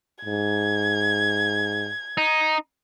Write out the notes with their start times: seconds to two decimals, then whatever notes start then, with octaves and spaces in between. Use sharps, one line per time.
0.25 G#2 G#6
2.18 D#4